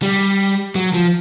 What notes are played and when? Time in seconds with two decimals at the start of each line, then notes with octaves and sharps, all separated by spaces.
0.02 G3
0.76 F#3
0.94 F3